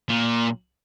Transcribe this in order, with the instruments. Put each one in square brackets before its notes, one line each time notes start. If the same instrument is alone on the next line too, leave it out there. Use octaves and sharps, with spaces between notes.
[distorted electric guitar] A#2